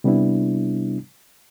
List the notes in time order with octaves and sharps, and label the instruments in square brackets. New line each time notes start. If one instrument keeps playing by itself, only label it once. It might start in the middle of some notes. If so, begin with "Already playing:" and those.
[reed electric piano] C3 G3 B3 D4 E4